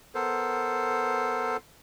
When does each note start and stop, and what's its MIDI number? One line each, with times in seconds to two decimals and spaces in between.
0.15 1.57 59
0.15 1.57 69
0.15 1.57 70
0.15 1.57 72